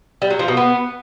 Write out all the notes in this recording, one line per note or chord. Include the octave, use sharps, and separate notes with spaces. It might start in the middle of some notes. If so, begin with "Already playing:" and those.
G3
F#3
F3
B2
B3